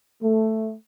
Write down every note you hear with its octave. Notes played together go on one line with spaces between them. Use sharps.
A3